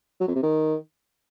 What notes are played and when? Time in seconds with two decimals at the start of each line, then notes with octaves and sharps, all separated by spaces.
0.20 F#3
0.28 F2
0.35 C3
0.42 D#3